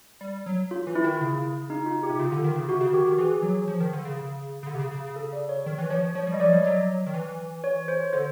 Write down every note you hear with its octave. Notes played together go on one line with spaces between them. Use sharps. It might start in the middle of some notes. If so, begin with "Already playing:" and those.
G3
F#3
F4
E3
E4
D#3
C#3
D#4
F4
G4
C3
C#3 F4
D3
D#3
C#3
C3 F#4
C#3 F#4
D#3 G4
D#3
E3 G#4
F#3
F3
D#3
D3
C#3
C#3
C#3
D3
C3
C#3
C#3
C#3
A4
D5
C#5
D#3
E3
F3 C#5
F3 C#5
G3
D#5
F3 D5
G3
F#3
D#3
E3
C#5
C5
D3 C5